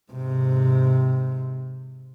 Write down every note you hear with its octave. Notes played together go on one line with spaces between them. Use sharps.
G#2 C3